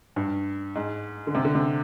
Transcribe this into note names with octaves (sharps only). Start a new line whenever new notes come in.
G2
G#2
D3
C3
D3
C3